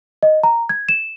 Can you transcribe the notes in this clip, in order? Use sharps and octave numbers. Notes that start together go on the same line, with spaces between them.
D#5
A#5
G#6
E7